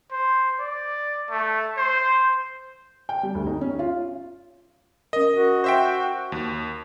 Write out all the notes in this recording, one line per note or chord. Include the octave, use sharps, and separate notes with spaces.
C5
D5
A3
C5
G5
G3
D2
D#4
C#4
F4
C#4 A#4 D#5
F#4 A#4
C5 E5 G5
D#2